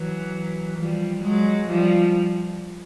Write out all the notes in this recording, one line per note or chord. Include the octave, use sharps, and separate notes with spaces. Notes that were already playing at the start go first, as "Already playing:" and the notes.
Already playing: E3 F#3
F3 G3
F#3 G#3
F3 G3